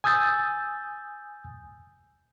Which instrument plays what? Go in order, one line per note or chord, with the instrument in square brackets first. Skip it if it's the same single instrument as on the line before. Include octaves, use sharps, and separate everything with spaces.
[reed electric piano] G#5 D#6 E6 G6 A6